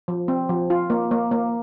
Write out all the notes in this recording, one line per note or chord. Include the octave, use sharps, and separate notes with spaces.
F3
C4
F3
F4
A#3
A#3
A#3